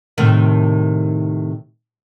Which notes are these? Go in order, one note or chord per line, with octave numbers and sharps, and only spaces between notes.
A2 C3 D#3